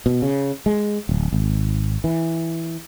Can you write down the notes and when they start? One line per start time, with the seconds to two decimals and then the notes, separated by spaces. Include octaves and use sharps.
0.06 B2
0.22 C#3
0.66 G#3
1.09 D1
1.32 G#1
2.04 E3